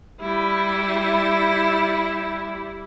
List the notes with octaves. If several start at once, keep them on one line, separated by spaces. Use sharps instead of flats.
G3 E4